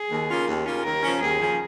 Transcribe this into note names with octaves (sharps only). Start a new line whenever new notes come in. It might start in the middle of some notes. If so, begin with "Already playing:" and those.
Already playing: G#4
D#2
C#3 A#3 C#4 F4
D#2
C#3 A#3 C#4 F4
D#2 A#4
C#3 F3 C#4
D#2 G#4
C#3 F3 C#4